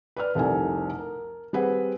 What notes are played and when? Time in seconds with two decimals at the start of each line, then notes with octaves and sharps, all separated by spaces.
0.16 B4 D5 F6
0.35 F1 C2 C3 A4 A#4 G#5
0.99 A#4
1.53 G3 C4 G#4 B4 C5 F#5